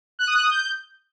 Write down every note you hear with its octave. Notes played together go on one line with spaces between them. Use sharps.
F#6
D#6
F#6
D#6
G6